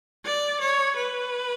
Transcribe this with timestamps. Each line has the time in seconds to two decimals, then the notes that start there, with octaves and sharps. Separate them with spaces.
0.25 D5
0.61 C#5
0.96 B4